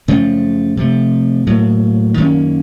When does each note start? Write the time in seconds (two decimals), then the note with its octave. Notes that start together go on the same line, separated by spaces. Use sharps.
0.08 F#2 C#3 F3 A3
0.77 C3 F3 A3
1.47 A2 F#3 A#3
2.17 F#2 D#3 A#3 C#4